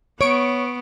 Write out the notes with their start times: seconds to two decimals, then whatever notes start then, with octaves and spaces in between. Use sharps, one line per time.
0.21 B3 C#5 C#6 D7